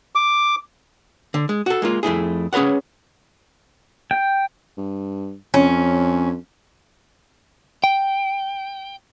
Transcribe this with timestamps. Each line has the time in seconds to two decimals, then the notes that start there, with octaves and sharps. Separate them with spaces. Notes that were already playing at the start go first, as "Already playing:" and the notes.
0.15 D6
1.34 D3
1.49 G#3
1.66 F#4 A4
1.82 G#3 A#3 F4
2.03 F2 A3 E4 G#4
2.53 C#4 G#4 B4 C#5 F#5
4.11 G5
4.77 G2
5.54 F2 C#4
7.84 G5